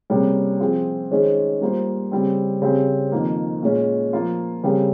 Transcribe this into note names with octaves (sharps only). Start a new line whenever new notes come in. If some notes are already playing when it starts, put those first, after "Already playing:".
C3 G3 A#3 C#4 G#4
F3 C4 F4 G#4
D#3 G#3 C#4 G#4 C5
G3 A#3 F4 C5
C#3 G3 C4
C#3 G3 C4 G4 C5
F2 D#3 A#3
A#2 G#3 C#4
F3 A#3 F4
C#3 G3 C4 G4 A#4